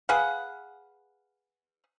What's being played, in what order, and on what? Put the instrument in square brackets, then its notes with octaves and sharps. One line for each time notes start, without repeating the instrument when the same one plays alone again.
[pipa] G#4 B4 F5 F#5